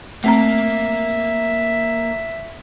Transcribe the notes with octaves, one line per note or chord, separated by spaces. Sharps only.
A3 A#3 C4 E5 A#5